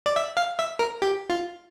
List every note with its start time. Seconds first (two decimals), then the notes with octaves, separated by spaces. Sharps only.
0.06 D5
0.16 E5
0.37 F5
0.59 E5
0.79 A#4
1.02 G4
1.30 F4